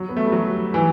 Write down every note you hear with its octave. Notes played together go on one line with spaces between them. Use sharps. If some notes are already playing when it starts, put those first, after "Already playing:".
Already playing: F#3
B3
A3
G3
F#3
E3